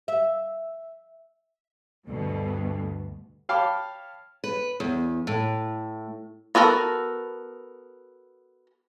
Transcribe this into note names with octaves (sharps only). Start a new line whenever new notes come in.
E5
D2 G2 B2
C#5 F5 G5 A5 B5 D6
B4
E2
A2
B3 F#4 A4 A#4